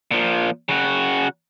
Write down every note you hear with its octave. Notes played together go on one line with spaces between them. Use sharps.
A#2 F3
C#3 F#4